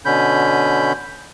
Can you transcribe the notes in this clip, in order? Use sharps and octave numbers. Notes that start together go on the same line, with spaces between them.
B2 D3 C#4 B5 G6